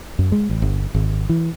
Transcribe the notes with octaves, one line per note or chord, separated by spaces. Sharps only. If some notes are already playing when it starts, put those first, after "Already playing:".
F#2
G#3
A1
G1
G#1
E3